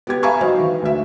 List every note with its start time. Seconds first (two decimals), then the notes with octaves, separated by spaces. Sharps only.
0.07 B3 G4 G#6
0.23 E5 F5 G#5 A#5 B5 C#6
0.41 F#3 D#4 C5 F5
0.60 E3
0.82 D2 E5